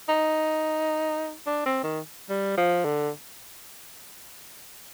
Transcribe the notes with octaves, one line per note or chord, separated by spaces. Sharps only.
D#4
D4
C4
D#3
G3
F3
D3